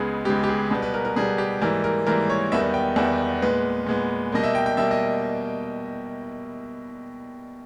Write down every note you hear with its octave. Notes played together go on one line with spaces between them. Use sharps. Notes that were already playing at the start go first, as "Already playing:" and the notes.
Already playing: C#2 C#3 G#3 B3 G#4
C#2 C#3 G#3 B3 G4
G4
G#4
B2 G3 B3
B4
A#4
A#4
B2 G3 B3 G#4
G4
G#2 E3 G3 A#3 A#4
A#4
G#2 E3 G3 A#3 A#4
C#5
E2 D#3 G3 B3 E5
G5
E2 D#3 G3 B3 E5
A#2 G#3 B3 B4
A#2 G#3 B3
B2 G3 A#3 D#5
E5
G5
G5
B2 G3 A#3 E5
D#5